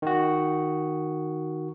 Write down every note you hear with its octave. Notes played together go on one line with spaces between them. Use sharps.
D#3 F#4